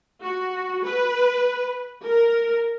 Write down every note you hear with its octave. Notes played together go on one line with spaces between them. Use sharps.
F#4
B4
A#4